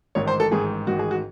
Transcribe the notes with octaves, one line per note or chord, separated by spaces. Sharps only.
A1 G#2 D#3 C#5
C5
A4
A1 G#2 D#3 G#4
A1 G#2 D#3 F#4
G#4
F#4